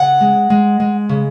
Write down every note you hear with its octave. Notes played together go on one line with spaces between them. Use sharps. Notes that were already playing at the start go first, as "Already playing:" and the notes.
Already playing: C#3 F#5
G#3
G#3
G#3
C#3